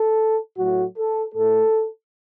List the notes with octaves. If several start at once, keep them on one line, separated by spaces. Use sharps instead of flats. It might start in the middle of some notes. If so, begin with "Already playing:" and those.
Already playing: A4
A2 F#3 A3 F#4
A4
A2 A3 A4